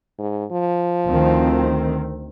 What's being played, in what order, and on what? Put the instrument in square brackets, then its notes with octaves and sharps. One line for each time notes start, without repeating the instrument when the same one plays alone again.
[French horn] G#2
F3
[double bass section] D2 D#3 C4